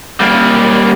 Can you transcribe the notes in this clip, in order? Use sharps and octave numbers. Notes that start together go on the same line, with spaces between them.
G3 A#3